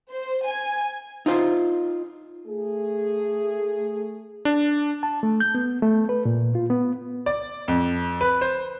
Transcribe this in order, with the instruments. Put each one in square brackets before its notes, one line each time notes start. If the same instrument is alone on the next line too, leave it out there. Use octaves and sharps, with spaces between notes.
[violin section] C5
G#5
[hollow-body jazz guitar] D#4 F4 C5
[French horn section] A3 G#4
[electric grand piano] D4
[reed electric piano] A5
A3
G6
B3
A3
B4
A#2
F4
B3
[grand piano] D5
F2
B4
C5